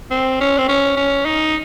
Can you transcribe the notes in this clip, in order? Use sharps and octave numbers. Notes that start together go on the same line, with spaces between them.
C4
C#4
C4
C#4
C#4
D#4